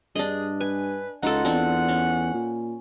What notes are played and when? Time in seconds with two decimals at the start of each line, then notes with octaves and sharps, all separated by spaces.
0.16 G2 D4 G#4 D#5
0.61 B4 G#5
1.23 C#2 D#4 F4 A4 F#5
1.45 E2 C4 D4
1.88 C#4
2.34 A#2